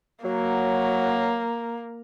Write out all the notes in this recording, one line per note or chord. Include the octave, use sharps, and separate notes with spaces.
F#3 A#3